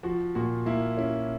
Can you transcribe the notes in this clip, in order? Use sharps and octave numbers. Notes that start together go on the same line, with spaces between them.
F3 F#4
A#2 F#4
A#3 E4
C#4 E4